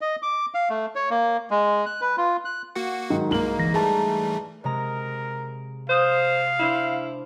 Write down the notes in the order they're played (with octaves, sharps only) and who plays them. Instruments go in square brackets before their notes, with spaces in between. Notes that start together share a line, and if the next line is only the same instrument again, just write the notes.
[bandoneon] D#5
D6
F5
A3
C#5
A#3
G#3
F#6
B4
F4
F#6
[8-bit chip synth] A#3 F#4 F#5
[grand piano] G#2 D#3 F#3
[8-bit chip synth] C2 A#3 [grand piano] G#2 A#4 F#7
[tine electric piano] G1 E3 A#6
[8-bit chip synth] E3 G3 A3 [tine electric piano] G#4 A5 A#5
[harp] C3 G#3 A#5 [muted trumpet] A#4
[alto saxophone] C5 [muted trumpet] F5 [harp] D#6 F#6
[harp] D4 C5 [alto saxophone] E4